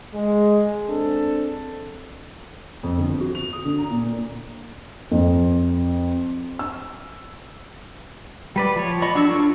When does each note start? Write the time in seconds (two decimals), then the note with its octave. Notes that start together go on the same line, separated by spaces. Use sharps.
0.13 G#3
0.88 C4 D4 A4
2.83 F2
2.98 G1
3.21 F#4
3.35 F7
3.53 D#6
3.65 D3
3.78 A#5
3.90 A#2
4.04 A#3
5.11 F2
6.59 E6
8.56 G3 B4 D5
8.76 F3 C#5
9.02 D5 D#5 B5 C#6
9.14 F#3 D4 C#6 E6
9.28 D4 F4 A4